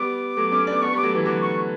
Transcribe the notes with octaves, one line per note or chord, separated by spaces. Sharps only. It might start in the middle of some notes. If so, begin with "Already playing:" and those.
Already playing: G3 B3 D6
F#3 A3
A3 C#4
B3 D4
B3 D4 C#6
G3 B3 D6
F#3 A3
E3
D3 F#3 D6
C#6